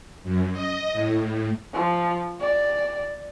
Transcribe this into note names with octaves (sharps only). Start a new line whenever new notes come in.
F#2
D#5
A2
F3
D5